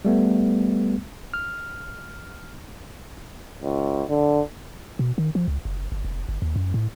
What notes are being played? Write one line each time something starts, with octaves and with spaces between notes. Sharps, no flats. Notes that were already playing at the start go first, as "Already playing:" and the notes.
G3 A3 B3
F6
C#2
D3
B2
D#3
F3
C#2
F#1
G1
F1
G1
D#2
F#2
A2